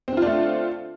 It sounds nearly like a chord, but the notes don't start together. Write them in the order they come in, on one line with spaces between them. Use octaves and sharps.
C4 D3 F4 D4 A3